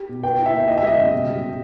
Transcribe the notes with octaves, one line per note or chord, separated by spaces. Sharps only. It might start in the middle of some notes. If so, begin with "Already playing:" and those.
Already playing: G4
B2
B4 G5
E4
E5
A#3
E4 D#5
E5
G#3 D#5
C#3
B2
G3
B2